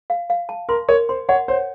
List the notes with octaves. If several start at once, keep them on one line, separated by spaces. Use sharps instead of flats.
F5
F5
A5
A#4 C6
A#4 C#5
C5 C6
C#5 F#5
C5 C#5